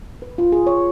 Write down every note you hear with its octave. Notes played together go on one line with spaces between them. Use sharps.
B4
F4
G#4
C#5